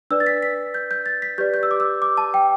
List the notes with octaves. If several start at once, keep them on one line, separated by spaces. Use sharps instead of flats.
D4 B4 D5 E6
A6
B6
B6
G6
G6
A6
B6
G4 B4 D5 G6
G6
E6
D6
E6
D6
A5
G5